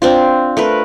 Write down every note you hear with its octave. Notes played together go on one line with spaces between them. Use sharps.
C4 D4 F4
A3 A#4 B4